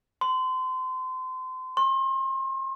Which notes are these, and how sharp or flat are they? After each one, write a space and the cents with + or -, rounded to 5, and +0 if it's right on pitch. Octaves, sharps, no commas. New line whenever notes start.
C6 -30
C6 +40